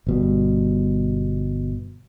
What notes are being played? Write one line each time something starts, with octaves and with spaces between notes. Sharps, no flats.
G1 B2 G3